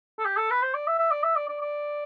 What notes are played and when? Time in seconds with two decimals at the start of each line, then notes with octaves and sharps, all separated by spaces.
0.18 A4
0.25 G4
0.37 A4
0.51 B4
0.63 C5
0.75 D5
0.87 E5
0.98 E5
1.11 D5
1.24 E5
1.36 D5
1.48 D5
1.61 D5